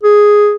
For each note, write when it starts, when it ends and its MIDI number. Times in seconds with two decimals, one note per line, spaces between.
0.03 0.55 68